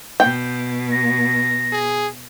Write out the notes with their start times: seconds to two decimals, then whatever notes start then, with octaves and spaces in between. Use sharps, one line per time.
0.20 B2 G5
0.92 A#6
1.72 G#4